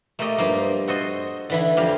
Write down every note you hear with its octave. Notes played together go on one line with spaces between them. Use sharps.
A3 A#3 G4 A4 D#5
G2 F3 A#3
F#4 A4 C5 D#5
D3 E3 E4
F2 G4 F5